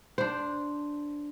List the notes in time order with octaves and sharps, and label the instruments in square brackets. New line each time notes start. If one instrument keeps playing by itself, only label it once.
[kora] D4 C5